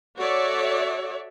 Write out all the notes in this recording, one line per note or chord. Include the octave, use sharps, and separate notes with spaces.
F#4 A4 C#5 D5 E5